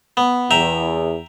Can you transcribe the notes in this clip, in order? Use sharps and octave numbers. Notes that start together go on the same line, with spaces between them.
B3
E2 E5 G5 A#5